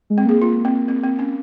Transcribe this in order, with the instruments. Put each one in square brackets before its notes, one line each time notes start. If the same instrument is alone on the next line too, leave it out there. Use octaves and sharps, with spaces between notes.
[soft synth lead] G#3
[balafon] C4
[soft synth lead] A#3 [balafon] G#4
[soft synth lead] A#3 [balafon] F4
[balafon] C4
C4
C4
C#4